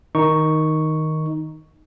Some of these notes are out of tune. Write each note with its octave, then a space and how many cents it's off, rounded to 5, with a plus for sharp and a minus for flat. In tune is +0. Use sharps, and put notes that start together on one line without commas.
D#3 +5 D#4 +0 C#6 +0